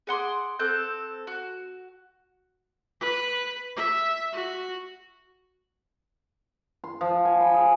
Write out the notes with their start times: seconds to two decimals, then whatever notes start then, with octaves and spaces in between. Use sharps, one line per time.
0.07 G#4 F#5 C6 D6
0.59 C4 A4 F#6 G6
1.27 F#4
3.00 B4
3.76 E5
4.32 F#4
6.84 C6
7.01 F3
7.25 G#5
7.40 B5
7.54 G#4